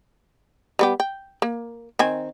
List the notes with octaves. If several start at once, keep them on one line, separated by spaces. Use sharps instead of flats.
G3 B3 G4
G5
A#3
D#3 C4 G#5